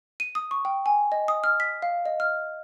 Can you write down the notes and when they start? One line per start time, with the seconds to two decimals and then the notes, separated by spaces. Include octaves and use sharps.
0.20 D#7
0.35 D#6
0.51 C#6
0.65 G5
0.86 G#5
1.12 D#5
1.28 D#6
1.44 F6
1.60 B6
1.82 F5
2.06 D#5
2.20 F6